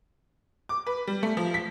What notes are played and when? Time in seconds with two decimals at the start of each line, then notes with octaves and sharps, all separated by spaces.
0.69 D6
0.87 B4
1.07 G3
1.23 A3
1.37 F3
1.54 B6